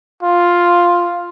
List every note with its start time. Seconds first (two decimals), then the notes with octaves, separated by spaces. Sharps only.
0.23 F4